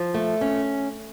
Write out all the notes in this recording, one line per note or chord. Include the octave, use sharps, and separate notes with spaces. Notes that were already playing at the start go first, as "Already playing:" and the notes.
Already playing: F3
A3
C#4